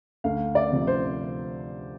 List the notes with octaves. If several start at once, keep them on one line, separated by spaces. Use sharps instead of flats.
D2 F5
D5
C3 F3
C5